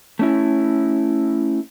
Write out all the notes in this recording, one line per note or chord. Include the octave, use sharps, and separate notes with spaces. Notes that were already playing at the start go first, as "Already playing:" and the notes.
A3 C#4 E4